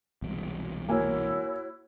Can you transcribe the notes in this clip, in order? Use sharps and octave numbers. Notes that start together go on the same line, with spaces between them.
E1 C2
A#3 E4 F#4 C#5 G#5